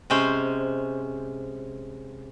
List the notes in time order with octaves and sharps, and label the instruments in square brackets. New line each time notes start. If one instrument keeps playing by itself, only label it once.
[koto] C3 G#3 C#4 C5